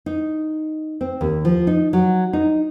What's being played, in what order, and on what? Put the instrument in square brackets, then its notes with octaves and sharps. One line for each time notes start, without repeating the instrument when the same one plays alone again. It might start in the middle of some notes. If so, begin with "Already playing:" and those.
[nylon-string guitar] D#4
C4
D#2
F3
D#4
F#3
D#4